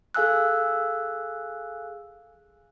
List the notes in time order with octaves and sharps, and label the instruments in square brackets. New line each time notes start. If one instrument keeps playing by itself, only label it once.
[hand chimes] G#4 A4 F5 G#5 E6 F#6